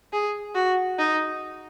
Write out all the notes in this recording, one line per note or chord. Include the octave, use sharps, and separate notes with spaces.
G#4
F#4
D#4